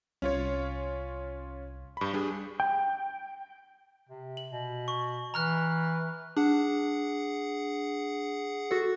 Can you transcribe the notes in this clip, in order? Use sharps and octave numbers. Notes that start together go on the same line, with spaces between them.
C2 C#4 F4 C#5
G2 B5
G3 D4 G#4
G5
C3
F#7
B2
C#6
E3 A#5 F6 F#6
D4 G#4 F#5
F#4 A4